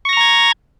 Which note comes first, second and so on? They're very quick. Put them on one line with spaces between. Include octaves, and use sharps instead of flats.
C#6 A#6 F6 A#5 G#6